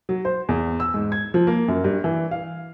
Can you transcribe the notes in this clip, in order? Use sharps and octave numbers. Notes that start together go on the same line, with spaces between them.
F#3
C5
E2
E6
G#2
G#6
F3
A#3
F#2
G2
E3
F5